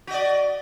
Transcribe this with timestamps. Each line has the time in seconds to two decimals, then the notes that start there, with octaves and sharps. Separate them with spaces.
0.07 F#4
0.11 D#5
0.14 D5